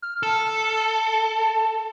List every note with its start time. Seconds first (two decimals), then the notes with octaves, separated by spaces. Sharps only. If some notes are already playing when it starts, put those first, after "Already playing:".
0.02 F6
0.23 A4 A5